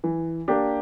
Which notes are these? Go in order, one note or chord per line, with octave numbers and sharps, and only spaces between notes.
E3
A#3 D4 G4